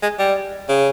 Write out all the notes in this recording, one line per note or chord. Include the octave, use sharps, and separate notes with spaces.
G#3
G3
C#3